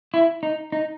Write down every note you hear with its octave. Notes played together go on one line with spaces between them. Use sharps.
E4
D#4
D#4